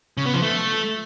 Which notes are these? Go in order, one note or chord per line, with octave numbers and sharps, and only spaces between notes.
C#3
B3
F3
A3